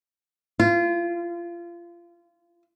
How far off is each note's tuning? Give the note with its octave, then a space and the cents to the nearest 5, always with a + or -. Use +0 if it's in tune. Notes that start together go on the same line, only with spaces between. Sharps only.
F4 -25